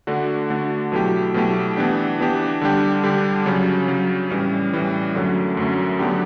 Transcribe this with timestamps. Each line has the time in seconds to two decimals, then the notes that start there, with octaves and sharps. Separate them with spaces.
0.07 D3 A3 D4 F#4
0.50 D3 A3 D4 F#4
0.92 B2 F#3 A3 E4 G4
1.34 B2 F#3 A3 E4 G4
1.77 E3 B3 D4 G4
2.18 E3 B3 D4 G4
2.61 D3 G3 D4 G4
3.04 D3 G3 D4 G4
3.46 C#3 F#3 C#4
3.88 C#3 F#3 C#4
4.30 A2 E3 G3 C#4
4.73 A2 E3 G3 C#4
5.15 F#2 D3 F#3 A3 C#4
5.57 F#2 D3 F#3 A3 C#4
5.99 D3 F#3 B3 D4 G4